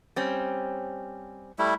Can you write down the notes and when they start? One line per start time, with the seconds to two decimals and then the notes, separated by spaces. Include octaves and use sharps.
0.16 G3 C4 C#4
1.59 G3 A3 E4